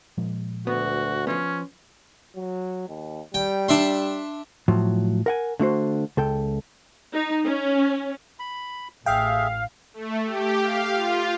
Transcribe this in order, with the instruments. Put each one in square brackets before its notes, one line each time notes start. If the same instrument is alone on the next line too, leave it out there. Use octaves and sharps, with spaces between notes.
[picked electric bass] A#2 F3 G#3
[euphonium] D2 [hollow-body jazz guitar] B3 [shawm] F#4
[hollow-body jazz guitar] F3 B3 [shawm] C#4
[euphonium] F#3
D#2
[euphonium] G3 [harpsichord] G5
[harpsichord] D4 E5 C6
[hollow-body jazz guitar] A2 F3 F#3
A#4 F#5 G#5
D3 A3 F#4 C5
C#2 A4 G5
[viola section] D#4
C#4
[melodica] B5
[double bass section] A1 [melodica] G#4 E5 [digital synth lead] F5 [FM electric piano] G5
[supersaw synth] A3
G4
F5
F4